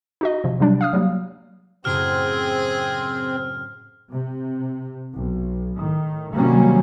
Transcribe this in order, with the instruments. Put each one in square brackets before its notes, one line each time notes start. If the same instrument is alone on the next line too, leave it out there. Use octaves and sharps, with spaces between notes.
[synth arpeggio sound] D#4 F#4 D#5
C3 F3
C3 F#3 G3 D4
F5 D#6 F6
F#3 G3 A#3
[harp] F#2 A2 C#3 [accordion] C4 [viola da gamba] G#4 [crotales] F6
[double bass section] C3
B1
A2 D#3
C3 D#3 F#3 G3 A#3 C#4